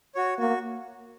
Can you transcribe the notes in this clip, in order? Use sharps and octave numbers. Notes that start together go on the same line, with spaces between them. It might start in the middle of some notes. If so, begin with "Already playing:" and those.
F#4 C#5
A#3 F#4